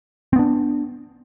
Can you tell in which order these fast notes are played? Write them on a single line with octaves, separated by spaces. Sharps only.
C4 B3 D4